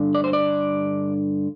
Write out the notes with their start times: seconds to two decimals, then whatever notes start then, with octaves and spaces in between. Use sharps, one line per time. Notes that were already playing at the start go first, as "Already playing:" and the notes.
Already playing: G2 D3
0.15 D5
0.24 C5
0.33 D5